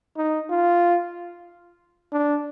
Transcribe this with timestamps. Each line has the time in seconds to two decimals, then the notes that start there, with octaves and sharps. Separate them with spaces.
0.17 D#4
0.50 F4
2.12 D4